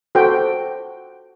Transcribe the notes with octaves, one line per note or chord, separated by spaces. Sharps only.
F#4 A4 C5 G5